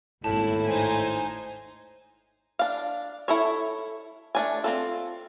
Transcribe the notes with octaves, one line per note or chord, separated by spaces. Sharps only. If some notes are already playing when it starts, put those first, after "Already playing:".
G#1 D#2 A2 E4 A5
D#4 C5 G#5
D4 F5
E4 A4 C#5
A3 D4 G#5
C4 F4 A4